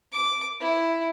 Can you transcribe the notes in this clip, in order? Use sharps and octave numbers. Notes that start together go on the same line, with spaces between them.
D6
E4